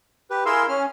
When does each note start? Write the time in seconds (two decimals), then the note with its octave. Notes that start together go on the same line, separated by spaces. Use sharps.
0.30 G4 B4
0.46 E4 G#4 A#4 F5 C6 E6
0.69 C#4 F6